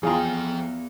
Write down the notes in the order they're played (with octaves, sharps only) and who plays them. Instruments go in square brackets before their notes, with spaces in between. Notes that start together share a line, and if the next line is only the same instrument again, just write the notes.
[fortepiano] E2 F5 A#5 [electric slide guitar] F3 G5 [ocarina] B3 [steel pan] F4 G#4